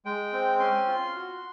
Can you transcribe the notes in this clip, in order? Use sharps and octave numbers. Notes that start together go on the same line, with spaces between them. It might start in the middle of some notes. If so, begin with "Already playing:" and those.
G#3 G5
C4
C#4 C6
F4
F#4